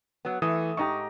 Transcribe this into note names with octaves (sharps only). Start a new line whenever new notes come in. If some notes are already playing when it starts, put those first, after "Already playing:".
F#3 B3
E3 A3 D#6
G#2 D#4 G4 C#6